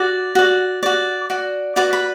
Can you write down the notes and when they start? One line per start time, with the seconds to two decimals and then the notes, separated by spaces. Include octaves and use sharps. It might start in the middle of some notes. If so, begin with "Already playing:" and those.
Already playing: F#4 D5 D6
0.35 F#4 D5
0.83 F#4 D5
1.30 F#4 D5
1.76 F#4 B4 D5 D6
1.93 B5